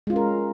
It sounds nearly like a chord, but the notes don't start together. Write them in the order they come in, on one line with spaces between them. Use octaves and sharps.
G#3 F4 C#4 A#4